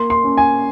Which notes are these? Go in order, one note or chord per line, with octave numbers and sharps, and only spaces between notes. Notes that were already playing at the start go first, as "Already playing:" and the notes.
Already playing: A#3 C6
C6
C#4
G#5